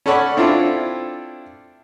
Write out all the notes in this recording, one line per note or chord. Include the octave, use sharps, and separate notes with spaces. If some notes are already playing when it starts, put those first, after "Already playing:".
C#4 A4 C#5 D5 F#5 B5
C4 D4 E4 F4 A4